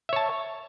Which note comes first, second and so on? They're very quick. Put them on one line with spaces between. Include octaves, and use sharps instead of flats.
E5 C#5 A5